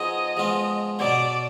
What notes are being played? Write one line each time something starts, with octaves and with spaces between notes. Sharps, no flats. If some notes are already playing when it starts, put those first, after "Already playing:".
Already playing: F3 B3 D#4 G#4 D#5
F3 G#3 B3 F4
B2 F#3 B3 D5